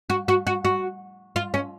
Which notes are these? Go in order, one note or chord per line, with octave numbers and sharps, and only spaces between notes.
F#4
F#4
F#4
F#4
F4
C#4